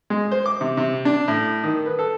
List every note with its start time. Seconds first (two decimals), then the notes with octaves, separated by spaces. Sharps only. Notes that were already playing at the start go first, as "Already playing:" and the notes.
0.10 G#3
0.32 C5
0.46 D6
0.61 C3
0.77 C3
1.05 D4
1.28 A2
1.63 D#3
1.86 B4
1.99 A4